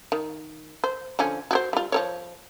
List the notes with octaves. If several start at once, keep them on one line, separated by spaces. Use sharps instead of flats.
D#3
C5
D3 F3 C#4
F#4 G4 C5
G3 F4
F3 A#4 C#5